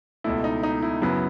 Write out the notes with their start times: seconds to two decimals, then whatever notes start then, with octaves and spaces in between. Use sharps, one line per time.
0.24 C#2 B2 A3 E4
0.44 D#4
0.63 D#4
0.82 E4
1.02 F#2 C#3 F#3 B3 E4